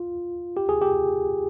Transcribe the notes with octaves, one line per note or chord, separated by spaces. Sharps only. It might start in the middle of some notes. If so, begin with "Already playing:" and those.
Already playing: F4
G4
G#4
G4